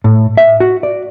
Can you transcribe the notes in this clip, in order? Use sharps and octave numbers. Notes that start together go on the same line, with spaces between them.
A2
E5
F#4
D5